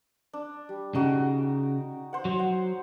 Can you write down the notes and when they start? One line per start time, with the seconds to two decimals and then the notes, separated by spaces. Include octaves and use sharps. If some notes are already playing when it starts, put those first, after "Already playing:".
0.33 D4
0.69 G3
0.95 C#3 D#4 F#4 G5
2.13 C5 F#5
2.25 F#3
2.39 F#5